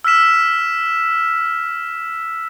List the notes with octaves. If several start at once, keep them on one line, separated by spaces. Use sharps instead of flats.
E6 F6 B6 E7